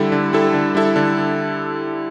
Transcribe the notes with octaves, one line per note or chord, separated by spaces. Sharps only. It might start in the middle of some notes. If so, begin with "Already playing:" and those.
Already playing: D3 G3 E4 A4
D3
G3 E4 A4
D3
G3 E4 A4
D3